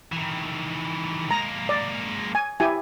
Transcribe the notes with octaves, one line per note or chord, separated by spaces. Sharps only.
D#3 E3
G#3 A#3 A#5
D5
G#5
E4 G4 G#5